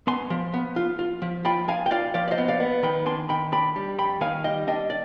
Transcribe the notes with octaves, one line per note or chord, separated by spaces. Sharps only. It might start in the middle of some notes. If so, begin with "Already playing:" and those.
B3 G#5 C6
F3
B3
F4
F4
F3
F4 G5 B5
F3 F5 G#5
G5
F4 D5 F5
F3 D5 F5
D5
C5 D#5
B3
D5 F5
B3
D#3 G5 B5
D4 G#5 C6
D#3 G5 B5
D4 G5 B5
G3
F2 G5 B5
D#3 F5 G#5
G3 D#5 G5
D4 D#5 G5
D5